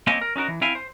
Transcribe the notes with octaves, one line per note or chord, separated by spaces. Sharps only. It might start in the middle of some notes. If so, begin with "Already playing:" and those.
A#3 C4 C#4 G4 D#5 G#5
A#4
C#4 D#4 F#4 A#4
E3
C4 E4 E5 F5 G5 G#5
C5